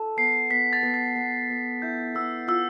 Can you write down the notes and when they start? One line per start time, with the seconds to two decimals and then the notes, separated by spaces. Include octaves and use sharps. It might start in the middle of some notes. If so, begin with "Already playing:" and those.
Already playing: A4
0.17 B3 C7
0.50 B3 B6
0.73 A6
0.83 B3
0.94 A6
1.16 B3
1.50 B3
1.82 E4 G6
2.15 B3 E6
2.48 F4 E6